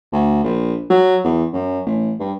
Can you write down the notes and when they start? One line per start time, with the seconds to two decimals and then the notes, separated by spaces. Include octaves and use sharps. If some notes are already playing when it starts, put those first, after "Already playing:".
0.13 D2
0.44 A#1
0.90 F#3
1.24 E2
1.53 F#2
1.86 A1
2.20 G2